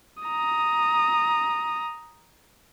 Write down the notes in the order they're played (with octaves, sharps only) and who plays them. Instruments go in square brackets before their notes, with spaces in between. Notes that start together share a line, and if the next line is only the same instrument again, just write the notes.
[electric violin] A#5 D#6